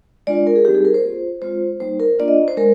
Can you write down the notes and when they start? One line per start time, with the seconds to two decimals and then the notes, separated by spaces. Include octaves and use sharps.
0.27 G#3 D4 F4 D5
0.47 A#4
0.55 G#4
0.65 G3 C4 D#4 G4
0.75 G#4
0.85 A#4
0.94 C5
1.04 A#3 F4
1.42 G#3 C4 F4 C5
1.80 G3 A#3 D#4 C5
2.00 A#4
2.19 A#3 D4 F4 D5
2.28 D#5
2.48 C5
2.57 G#3 A#4